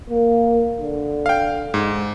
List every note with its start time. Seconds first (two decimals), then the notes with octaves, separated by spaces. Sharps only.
0.10 A#3
0.78 D3
1.26 F5 G5
1.74 G#2